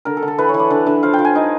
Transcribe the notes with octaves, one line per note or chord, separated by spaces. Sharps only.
D3 A#4
A4
D3
A4
E3 B4
C#5
E3
D5
D3
D3 E5
F3 F5
G5
F3
G#5
D#4